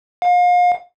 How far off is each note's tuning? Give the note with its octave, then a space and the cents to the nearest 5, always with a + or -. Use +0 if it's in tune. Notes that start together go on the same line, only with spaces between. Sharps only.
F5 +35